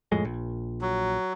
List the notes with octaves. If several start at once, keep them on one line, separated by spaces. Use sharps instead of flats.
F2 A2 G#3
A#1
F#3